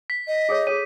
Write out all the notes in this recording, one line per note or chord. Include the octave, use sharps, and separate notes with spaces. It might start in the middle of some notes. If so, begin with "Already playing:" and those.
B6
D#5
G#4 A4 C#5
G#4 A4 C#5 D#7